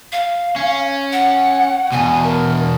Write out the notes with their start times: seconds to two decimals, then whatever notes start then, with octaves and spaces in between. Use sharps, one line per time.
0.12 F5
0.56 C#4
1.12 F#5
1.92 E2 B2 G#5
2.24 A#4